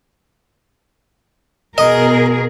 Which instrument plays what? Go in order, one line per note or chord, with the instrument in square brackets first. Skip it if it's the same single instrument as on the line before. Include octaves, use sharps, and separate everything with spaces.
[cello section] B2 G#4 A#4 [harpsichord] D#5